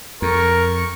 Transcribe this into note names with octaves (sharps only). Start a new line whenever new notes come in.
F2 A#4 C#6